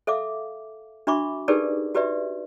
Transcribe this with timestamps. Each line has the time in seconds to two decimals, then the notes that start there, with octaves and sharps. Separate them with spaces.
0.07 A4 E5 F5 D6
1.07 D4 F#4 E5 B5 C#6 D6
1.48 D#4 G4 G#4 A#4 B4 D5
1.95 F#4 G4 B4 D5 E5